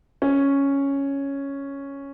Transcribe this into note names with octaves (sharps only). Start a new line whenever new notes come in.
C#4